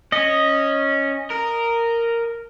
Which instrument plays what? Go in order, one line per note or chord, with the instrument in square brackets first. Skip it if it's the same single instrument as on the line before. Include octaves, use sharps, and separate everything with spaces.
[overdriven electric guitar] C#4 [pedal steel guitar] D#5
[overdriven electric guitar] A#4